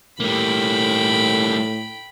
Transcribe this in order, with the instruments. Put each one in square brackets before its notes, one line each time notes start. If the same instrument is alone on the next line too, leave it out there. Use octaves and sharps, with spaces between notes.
[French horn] A2 [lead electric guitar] G3 A#3 [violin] G5 B5